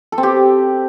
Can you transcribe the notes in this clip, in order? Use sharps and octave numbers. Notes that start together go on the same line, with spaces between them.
A4
C4
G4